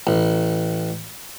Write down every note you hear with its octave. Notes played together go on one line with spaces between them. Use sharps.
A1